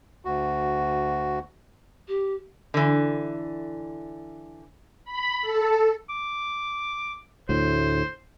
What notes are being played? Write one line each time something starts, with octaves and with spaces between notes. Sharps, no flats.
D2 F#4
G4
D3 E3
B5
A4
D6
D2 A2 C5